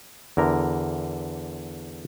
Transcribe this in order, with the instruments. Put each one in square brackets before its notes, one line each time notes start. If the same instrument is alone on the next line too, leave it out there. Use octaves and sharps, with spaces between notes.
[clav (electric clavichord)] E2 D3 A#4 A#5